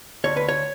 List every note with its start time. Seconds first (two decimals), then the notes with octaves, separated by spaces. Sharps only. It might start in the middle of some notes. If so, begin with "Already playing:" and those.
0.24 D2 C#5
0.37 B4
0.49 C#5